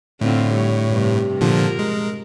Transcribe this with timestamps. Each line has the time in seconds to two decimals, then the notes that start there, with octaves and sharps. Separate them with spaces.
0.21 A2 D3 C4 F4
0.53 G3 C#5
0.88 G2 C3
1.41 A#2 D3 F3 A#4
1.79 G#3